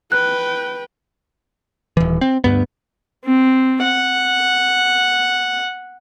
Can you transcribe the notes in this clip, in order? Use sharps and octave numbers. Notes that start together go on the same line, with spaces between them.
B4 G5 F#6
D#1 E3
C4
D2 G2 B3
C4
F#5